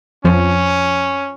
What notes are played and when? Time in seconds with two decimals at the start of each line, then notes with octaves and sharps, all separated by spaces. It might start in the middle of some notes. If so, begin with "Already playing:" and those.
0.25 F2 F3 C#4